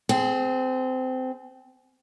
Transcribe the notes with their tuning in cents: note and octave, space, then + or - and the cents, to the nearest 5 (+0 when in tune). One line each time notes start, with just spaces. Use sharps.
C4 -20 G#4 +20